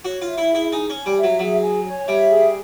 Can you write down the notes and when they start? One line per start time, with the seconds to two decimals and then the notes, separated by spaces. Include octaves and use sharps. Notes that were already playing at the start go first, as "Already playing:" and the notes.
0.05 F#4 C#5
0.22 F4
0.27 E5
0.38 E4
0.50 E4 G#4
0.72 D#4 G#5
0.90 C#4 C#5
1.06 G3
1.18 E5
1.24 F#3
1.39 F#3 G#4
1.63 G#5
1.85 C#5
2.07 G3 E5
2.30 G#4